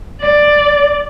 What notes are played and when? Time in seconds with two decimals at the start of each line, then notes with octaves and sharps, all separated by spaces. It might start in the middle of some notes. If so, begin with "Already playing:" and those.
0.21 D5